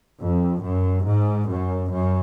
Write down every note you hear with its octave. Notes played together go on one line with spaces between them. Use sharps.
F2
F#2
G#2
F#2
F#2